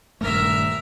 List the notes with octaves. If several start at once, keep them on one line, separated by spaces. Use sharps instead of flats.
D#1 G2 A3 A#4 E5